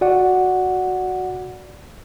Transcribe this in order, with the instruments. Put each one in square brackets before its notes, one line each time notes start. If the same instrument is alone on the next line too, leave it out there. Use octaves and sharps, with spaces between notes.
[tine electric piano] F#4 D5 F#5